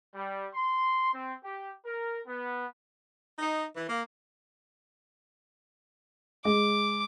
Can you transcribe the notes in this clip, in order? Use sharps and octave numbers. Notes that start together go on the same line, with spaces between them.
G3
C6
C4
G4
A#4
B3
D#4
E3
A#3
G#3 D6